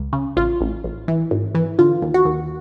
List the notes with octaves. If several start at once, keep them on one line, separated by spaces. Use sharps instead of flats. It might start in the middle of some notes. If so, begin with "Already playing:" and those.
Already playing: C#2
C#3
A1 F4
A1
A1
E3
G#1
E3
D3 F4
D#2
F#4
D#2